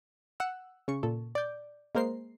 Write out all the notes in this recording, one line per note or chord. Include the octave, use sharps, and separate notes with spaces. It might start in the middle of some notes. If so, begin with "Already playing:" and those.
F#5 E6
C#3 C#6
A#2 A4
D5 G6
G#3 A#3 A#4 C5 C7